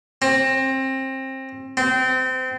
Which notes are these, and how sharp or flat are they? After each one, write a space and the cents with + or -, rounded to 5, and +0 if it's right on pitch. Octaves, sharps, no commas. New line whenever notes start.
C4 +25
C4 -25